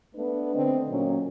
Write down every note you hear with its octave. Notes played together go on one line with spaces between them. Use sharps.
A3 B3 D4 B4
D3 C4 D#5
A#2 F#3 C#4